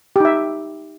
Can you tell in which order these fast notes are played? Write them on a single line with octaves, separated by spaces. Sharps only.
G4 D#4 E5